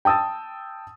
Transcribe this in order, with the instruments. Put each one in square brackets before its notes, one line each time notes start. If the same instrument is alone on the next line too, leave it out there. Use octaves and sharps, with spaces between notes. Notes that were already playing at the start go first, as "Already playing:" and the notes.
[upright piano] G5 A5 D#6 E6 A6